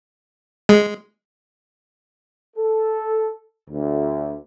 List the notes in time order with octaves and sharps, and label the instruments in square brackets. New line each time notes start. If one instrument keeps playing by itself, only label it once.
[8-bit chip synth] G#3
[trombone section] A4
D2